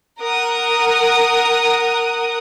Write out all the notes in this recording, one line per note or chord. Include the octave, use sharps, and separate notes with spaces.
A#4 F#5 D#6